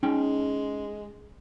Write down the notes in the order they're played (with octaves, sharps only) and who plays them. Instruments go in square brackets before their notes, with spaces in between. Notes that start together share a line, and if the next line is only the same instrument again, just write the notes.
[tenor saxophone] G#3 [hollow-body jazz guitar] C#4 D#4 G5